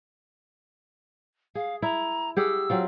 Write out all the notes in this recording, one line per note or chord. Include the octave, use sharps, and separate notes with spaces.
G#4 F5
E4 A#5
G4 G#4 F#5 E6
F#3 C4 F4